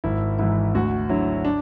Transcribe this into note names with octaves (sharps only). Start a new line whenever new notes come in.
G#1 E4
G#2 E3 E4
D2 F#4
D3 F#3 E4
D4